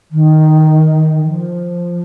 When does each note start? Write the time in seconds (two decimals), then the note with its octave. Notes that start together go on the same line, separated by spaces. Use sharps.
0.11 D#3
1.24 D#3
1.30 F3